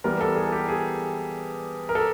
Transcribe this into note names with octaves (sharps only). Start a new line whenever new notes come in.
E3 G3 B3 A#4
A4
G#4
G4
G#4
A#4
A4